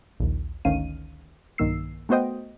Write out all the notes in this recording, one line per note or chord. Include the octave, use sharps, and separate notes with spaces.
A#1 D#2
G#1 D2 D#3 C#4 F5 D#7
B1 G2 D#3 A#3 E6 C7
A3 B3 F#4 C5 D#5 G5